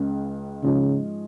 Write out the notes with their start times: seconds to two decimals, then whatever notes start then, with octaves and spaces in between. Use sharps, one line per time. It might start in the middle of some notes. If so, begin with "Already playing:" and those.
Already playing: C#2 C#3 G#3 C#4
0.63 G#2 C#3 F3 G#3 C#4 F4